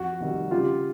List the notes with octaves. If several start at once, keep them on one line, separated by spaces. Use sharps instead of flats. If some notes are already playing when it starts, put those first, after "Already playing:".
Already playing: F2 F#4
C3 D#3 G3 C4
C#3 F4 G4